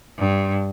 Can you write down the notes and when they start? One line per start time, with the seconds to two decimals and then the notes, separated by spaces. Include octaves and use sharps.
0.18 G2